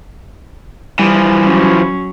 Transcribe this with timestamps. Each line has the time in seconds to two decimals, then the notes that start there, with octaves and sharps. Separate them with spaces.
0.99 E3 F3 G3
1.42 F#3 C#4